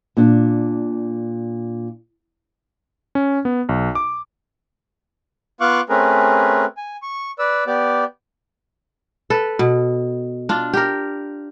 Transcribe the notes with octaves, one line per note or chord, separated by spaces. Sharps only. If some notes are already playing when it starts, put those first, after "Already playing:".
A#2 D4
C#4
B3
B1
D6
B3 F4 F5 C#6 D6 F#6
A3 C4 C#4 G#4 A#4 B4
G#5
C#6
B4 D5 E6
B3 G4 D5
A4 B4
B2
D4 F4
G4 A#4